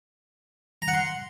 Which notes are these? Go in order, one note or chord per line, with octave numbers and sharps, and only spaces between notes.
A#5
F#5
C6